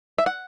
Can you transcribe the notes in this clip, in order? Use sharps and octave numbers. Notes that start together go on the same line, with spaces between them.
E5
F#5